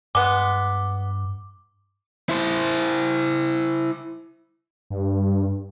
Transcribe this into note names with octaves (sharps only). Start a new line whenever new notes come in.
G2 G#3 B3 D6
E4 C5
G2